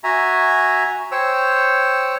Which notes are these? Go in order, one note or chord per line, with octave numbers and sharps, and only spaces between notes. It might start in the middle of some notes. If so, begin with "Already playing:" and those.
F#4 E5 G#5 A#5
C5 C#5 G5 E6